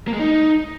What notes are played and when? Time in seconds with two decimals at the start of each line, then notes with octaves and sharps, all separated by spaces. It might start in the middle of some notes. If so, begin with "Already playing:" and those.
0.08 A#3
0.13 G#3
0.19 D#4